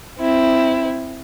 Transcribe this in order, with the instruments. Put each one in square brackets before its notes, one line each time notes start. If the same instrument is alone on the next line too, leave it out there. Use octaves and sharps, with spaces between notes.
[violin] C4 E4